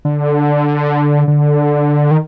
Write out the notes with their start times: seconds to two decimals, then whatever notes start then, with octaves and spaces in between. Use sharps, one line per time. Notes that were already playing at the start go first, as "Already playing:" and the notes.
0.05 D3
1.28 D3
2.11 D#3